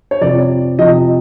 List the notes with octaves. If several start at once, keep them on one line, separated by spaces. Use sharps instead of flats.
C#5
F2 C3 F3 D5
F2 C3 F3 D#5